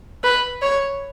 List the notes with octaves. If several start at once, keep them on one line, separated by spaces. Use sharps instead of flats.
B4
C#5